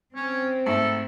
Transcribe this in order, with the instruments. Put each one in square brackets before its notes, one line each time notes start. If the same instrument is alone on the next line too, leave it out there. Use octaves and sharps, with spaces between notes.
[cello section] C4 [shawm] C#4
[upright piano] G#2 A3 [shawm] A4